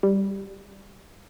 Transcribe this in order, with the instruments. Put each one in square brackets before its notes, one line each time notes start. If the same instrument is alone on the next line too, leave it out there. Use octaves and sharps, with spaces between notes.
[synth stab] G3